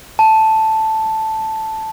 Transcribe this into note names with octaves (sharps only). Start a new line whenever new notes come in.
A5